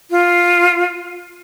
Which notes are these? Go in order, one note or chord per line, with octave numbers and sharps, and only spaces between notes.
F4